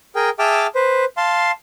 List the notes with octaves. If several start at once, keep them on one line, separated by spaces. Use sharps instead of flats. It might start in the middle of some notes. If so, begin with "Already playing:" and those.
G#4 A#4 G5
G#4 E5 G5 A5 D6 F6
B4 C5
F5 A5 C6